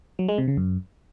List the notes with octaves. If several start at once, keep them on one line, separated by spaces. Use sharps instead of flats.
F#3
G#3
C3
C#3
F#2